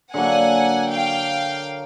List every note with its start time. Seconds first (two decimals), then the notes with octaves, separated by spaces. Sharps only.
0.14 D3 F#3 A#3 F#5 G#5
0.92 F5 G5